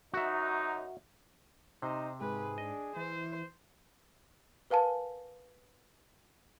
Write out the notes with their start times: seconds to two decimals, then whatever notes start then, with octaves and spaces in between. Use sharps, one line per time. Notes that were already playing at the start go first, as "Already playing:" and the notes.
0.13 F#2 D#4 F#4 E5
1.82 C3 D#4 C5
2.21 G#2 G#4 B4
2.58 D4 D#5
2.96 E3 C5
4.70 A#4 B4 F5 G#5 A5